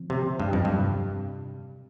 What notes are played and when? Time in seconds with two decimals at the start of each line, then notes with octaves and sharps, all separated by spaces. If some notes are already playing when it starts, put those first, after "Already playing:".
Already playing: D3 F3 C4
0.10 C3
0.40 G2
0.53 F2
0.65 G2
0.79 C3 G3 C4